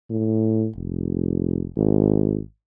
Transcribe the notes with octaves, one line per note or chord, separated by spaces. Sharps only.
A2
F1
G#1